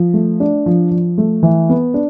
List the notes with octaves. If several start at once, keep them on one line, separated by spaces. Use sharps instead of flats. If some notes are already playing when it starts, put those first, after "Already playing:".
Already playing: F3
A3
D4
F3
F3
A3
E3
B3
D4